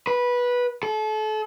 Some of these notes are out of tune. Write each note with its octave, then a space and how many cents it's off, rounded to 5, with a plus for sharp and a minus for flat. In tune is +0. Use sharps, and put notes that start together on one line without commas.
B4 -15
A4 -35